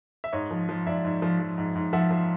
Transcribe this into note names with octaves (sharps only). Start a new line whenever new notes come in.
E5
G#2 C#5 D#5
F3
F3
G#2 D5 E5
G#2
F3
F3
G#2
G#2
F3 E5 F#5
F3